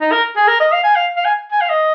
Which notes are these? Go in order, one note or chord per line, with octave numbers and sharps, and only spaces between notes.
D#4
A#4
G#4
A#4
D#5
F5
G#5
F5
F5
G#5
G#5
F5
D#5